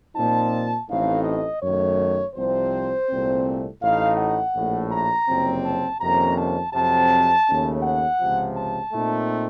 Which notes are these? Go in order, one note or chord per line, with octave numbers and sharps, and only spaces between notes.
A#2 F3 C4 D#4 A5
A1 A2 A3 C4 D#4 F5
D#5
F#2 D#3 A3 C#5
C2 C3 F3 C4 C5
C2 A#2 A3 C4
A1 A2 A3 D#4 F5
F#5
A#1 A2 A3
A#5
F#1 F2 C3 F#3 C4
A5
F2 C3 D#3 A#3 C#4 A#5
A5
F2 C3 F#3 C4 A5
D#2 C#3 A3 C#4
F#5
C#2 C3 F3
A5
A#2 A3 C4 D#4